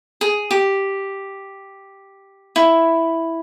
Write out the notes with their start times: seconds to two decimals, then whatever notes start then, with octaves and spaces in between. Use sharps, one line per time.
0.21 G#4
0.51 G4
2.56 E4